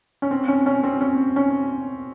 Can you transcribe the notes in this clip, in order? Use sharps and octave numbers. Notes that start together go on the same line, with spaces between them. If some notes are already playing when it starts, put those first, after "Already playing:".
C#4
C4
C#4
C#4
C4
C#4
C#4